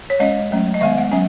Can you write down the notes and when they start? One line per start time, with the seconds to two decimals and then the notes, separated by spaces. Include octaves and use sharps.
0.10 C#5
0.20 G#3 C#4 D#5
0.51 F#3 A3 C#4
0.74 D#5
0.81 D#3 G#3 B3 E5
0.97 F#5
1.12 F#3 C#4 G#5